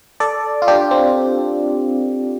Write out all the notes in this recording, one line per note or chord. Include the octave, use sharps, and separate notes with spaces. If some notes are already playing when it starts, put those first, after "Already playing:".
A4 D5
F4
D4 G4
C4